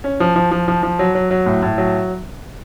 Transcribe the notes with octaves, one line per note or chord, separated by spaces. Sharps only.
C#4
F3
F3
F3
F3
F3
F#3
F#3
F#3
A2
A2
F#3